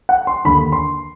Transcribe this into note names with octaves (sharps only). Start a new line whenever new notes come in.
F#5
C6
D#2 D3 B5
C6